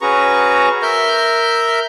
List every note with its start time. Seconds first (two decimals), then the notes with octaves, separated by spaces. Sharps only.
0.01 C#4 F#4 G#4 B4 A#5 C#6
0.82 A#4 E5 F6 G6